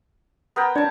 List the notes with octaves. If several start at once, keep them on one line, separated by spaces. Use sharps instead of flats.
B3 A#4 G5
D4 C#5 A5